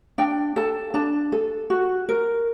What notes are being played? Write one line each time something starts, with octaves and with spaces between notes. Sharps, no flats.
D4 G5
A4 A5
D4 A5
A4
F#4
A#4